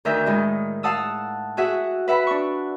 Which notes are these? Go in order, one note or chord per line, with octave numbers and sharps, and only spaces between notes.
D2 D#3 A#4 E5 G6
A2 D#3 G#3
F5 F#5 A5 D#6 E6
F#4 G#4 E5 F#5
B4 E5 F#5 B5
D4 C#6